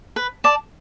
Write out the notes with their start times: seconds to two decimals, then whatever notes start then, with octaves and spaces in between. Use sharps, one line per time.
0.16 B4
0.44 D5 A5 D6